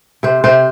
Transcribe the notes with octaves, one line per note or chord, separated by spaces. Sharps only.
C3 C5
C3 C5